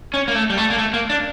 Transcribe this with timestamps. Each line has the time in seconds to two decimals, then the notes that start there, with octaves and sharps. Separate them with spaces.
0.14 C#4
0.28 A#3
0.35 A3
0.50 G3
0.57 A3
0.70 A#3
0.78 A3
0.94 A#3
1.10 D4